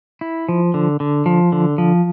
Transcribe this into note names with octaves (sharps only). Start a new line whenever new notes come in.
E4
F3
D3
D3
F3
D3
F3